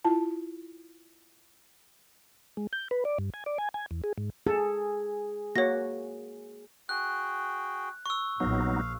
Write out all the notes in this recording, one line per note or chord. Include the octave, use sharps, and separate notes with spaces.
E4 F4 A5
G#3
G6
B4
D5
G2
G#5
D5
G#5
G#5
E2
G#4
G#2
G#4 A4
A#3 F#4 C#5 A#6
F#4 G#4 G5 F#6
C#6 E6
A#1 F#3 B3 D#4 F5